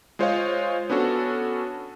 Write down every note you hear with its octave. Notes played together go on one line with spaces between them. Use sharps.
G#3 F4 C5 C#5 D#5 F5
B3 C#4 D4 F#4 A4